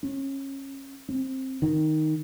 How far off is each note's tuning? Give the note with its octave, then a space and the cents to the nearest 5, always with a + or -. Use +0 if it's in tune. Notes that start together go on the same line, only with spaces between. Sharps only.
C#4 -25
C4 +15
D#3 +0